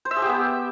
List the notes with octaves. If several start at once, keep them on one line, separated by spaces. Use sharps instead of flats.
C5
E5
G#4
G4
B3